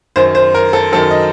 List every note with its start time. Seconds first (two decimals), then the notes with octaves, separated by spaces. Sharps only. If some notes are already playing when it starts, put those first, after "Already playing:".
0.16 F#2 D#3 F#3 C5
0.35 C5
0.54 A#4
0.73 A4
0.92 F#2 D#3 F#3 A4
1.11 D#5